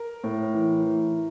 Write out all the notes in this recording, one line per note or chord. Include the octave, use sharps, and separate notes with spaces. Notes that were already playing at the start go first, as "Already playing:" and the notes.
Already playing: A#4
A2
E3
E3